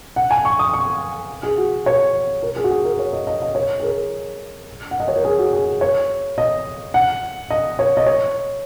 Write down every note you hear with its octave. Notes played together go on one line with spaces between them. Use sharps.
F#5
G#5
C#6
D#6
C#6
G#4
F#4
C#5
A#4
G#4
F#4
G#4
A#4
C#5
D#5
D#5
D#5
C#5
G#4
A#4
F#5
D#5
C#5
A#4
G#4
F#4
G#4
C#5
D#5
F#5
D#5
C#5
D#5
C#5